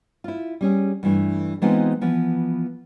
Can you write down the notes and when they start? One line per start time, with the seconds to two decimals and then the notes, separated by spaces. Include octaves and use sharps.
0.24 E4 F4
0.61 G3 C#4 G#4
1.03 G2 E3 A3
1.62 E3 G#3 B3 C4 D#4 F4
2.01 E3 F3 B3